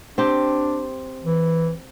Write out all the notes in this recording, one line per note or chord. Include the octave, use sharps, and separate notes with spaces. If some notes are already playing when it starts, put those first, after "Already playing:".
C4 D4 G4
E3